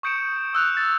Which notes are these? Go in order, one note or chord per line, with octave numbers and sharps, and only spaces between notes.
C#6 D#6 G6 C#7 D7 E7
C#6
D#6 E6 F#6 F7
A6